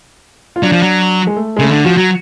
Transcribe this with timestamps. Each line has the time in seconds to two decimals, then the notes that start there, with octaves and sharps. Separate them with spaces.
0.56 F4
0.63 F#3 D4
0.72 F3
0.82 F#3
1.27 G#3
1.36 A3
1.57 G#3
1.59 C#3 A3
1.71 D3
1.85 F3 F#4
1.97 F#3